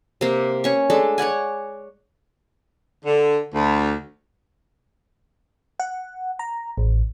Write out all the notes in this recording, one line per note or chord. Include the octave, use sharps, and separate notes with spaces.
C3 A#3
C#4 C#6
G#3 A3 D4 A4
C#5 D5 F#5 G#5
D3
D2
F#5
A#5
A1